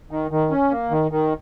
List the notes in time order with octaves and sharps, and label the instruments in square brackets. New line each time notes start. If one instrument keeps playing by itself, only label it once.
[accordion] D#3
D#3
C#4
A#3
D#3
D#3